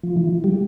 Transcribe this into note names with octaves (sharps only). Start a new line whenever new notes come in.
F3
E3
G3